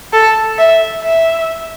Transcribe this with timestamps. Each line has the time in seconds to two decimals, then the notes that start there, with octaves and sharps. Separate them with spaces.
0.13 A4
0.59 E5
1.02 E5